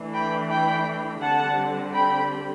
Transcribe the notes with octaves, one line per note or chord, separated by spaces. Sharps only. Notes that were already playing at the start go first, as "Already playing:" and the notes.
Already playing: E3 A3 D4
G5 B5
G5 B5
D3 G3 C4 F#5 A5
G5 B5